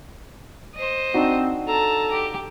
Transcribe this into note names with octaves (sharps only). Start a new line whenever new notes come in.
C5 D#5
C4 D4 D#4 F#4
A4 A5 A#5
G4